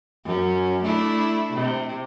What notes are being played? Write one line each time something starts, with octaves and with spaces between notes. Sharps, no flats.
F#2 C#4
A3 D4 E4
C3